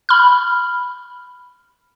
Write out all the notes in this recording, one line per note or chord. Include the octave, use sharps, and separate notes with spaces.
B5 F6